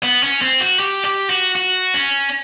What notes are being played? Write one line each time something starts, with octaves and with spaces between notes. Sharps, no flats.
B3
C#4
C4
F#4
G4
G4
F#4
F#4
C#4